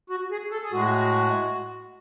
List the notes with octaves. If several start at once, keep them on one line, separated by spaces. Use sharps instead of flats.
F#4
G#4
A4
G#4
A2 G#3 F#4